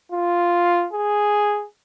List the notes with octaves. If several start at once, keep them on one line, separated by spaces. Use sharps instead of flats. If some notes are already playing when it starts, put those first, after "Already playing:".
F4
G#4